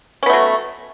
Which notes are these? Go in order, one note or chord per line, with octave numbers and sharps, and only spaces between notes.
F#3 A3 B3 C#4